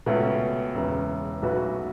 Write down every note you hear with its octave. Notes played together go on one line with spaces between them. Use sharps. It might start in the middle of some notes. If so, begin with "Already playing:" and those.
C#2 B2 A3 C#4
E1 E2 C#3 E3
B1 B2 A3 F#4 B4